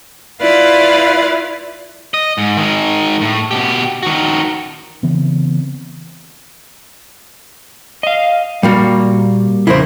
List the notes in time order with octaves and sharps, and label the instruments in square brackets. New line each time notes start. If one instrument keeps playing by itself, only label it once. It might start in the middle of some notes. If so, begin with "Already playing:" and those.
[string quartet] E4 F4 B4 D5 F5
[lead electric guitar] D#5
G#2
D#3 G#3
A2
B2 G4
D#3 F#4
[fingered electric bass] C#3 E3 B3 C4
[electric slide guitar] D#5 F5
[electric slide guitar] A#2 [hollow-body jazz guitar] G3 A#3 F#4
[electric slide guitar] F2 C#3 [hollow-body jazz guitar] E4 A#4 C5